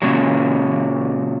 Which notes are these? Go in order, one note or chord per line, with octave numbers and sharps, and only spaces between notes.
A#2 C#3 F#3